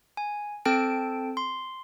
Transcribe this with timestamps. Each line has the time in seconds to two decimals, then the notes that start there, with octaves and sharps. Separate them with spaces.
0.17 G#5
0.65 C4 A4 G5 A5 D7
1.37 C6